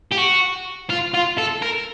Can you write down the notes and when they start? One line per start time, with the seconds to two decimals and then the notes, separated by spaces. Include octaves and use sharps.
0.12 G4
0.17 F#4
0.90 F4
1.14 F4
1.38 A4
1.62 A#4